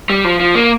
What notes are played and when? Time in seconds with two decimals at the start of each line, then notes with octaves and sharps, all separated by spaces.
0.10 G3
0.24 F3
0.40 F3
0.55 A#3